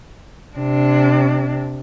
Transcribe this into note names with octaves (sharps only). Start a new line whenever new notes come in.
C3 D4